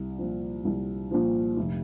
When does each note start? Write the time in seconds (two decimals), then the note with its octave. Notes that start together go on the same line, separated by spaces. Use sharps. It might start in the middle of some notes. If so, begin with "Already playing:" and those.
Already playing: C2
0.19 A#2 F3
0.65 C2
1.11 A#2 F3
1.57 F1